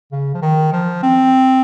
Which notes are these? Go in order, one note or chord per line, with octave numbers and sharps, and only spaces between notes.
C#3
F3
D#3
F3
C4